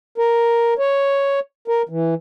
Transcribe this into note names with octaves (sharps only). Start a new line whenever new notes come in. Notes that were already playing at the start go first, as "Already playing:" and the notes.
A#4
C#5
A#4
E3